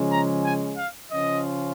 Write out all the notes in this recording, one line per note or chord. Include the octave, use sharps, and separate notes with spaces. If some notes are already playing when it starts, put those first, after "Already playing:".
Already playing: C#3 F3 G#3 C#4
A#5
G#5
F5
C#3 F3 C#4 F4 D#5